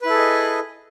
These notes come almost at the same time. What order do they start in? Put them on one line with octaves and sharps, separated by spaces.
B4 E4 A4 G#4 D#5